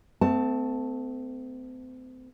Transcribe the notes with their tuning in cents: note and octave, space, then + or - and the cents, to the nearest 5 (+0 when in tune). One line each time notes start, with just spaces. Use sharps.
A3 +10 C4 -40 A5 +0